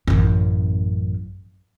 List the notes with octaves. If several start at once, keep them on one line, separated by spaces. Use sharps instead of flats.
A1 F#2